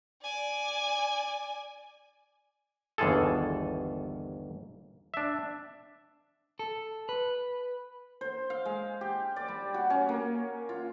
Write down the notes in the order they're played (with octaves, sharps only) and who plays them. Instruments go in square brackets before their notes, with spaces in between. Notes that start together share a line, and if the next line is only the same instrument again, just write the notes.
[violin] D5 G#5
[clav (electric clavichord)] G1 D#2 E3 F4 G#4 A4
D4 E5
[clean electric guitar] A4
B4
[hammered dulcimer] C5
F5
G#3
G4
D5
G3
F#4
C#4
A#3
F4